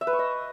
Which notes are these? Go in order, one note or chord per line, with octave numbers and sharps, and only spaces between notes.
E5
B4
C#6
D#5